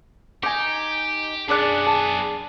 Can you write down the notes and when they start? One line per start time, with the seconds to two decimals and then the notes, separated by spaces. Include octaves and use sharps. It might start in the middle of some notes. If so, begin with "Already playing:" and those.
0.43 D#4 G4 G#5 D6
1.48 F#2 B3 D4 G#4 D5 F#6
1.87 A5